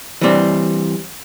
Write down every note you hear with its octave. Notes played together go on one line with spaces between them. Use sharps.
E3 G3 C4